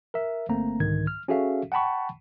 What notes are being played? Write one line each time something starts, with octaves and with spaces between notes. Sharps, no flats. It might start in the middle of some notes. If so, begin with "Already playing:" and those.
A#4 E5
G1 A3 A#3 C4 A#5
C2 G#2 D3 D#3 G#6
F6
C#4 F#4 G#4 A4 E5 F5
F#5 G5 A5 B5 C#6